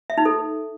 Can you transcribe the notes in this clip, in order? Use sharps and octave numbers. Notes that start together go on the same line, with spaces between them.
E5
D#4
A4